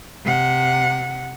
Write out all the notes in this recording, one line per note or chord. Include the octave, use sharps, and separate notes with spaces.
C3 F#5